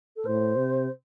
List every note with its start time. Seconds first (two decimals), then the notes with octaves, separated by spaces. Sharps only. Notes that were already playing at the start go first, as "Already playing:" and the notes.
0.16 A4
0.26 A2 C5
0.56 C3